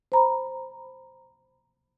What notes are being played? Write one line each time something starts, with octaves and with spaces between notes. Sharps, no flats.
C5 A#5 B5